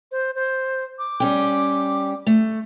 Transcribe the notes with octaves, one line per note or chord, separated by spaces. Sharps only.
C5
C5
D6
G3 C#4 G5
A3